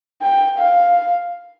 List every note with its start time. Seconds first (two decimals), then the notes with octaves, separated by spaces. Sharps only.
0.22 G5
0.59 F5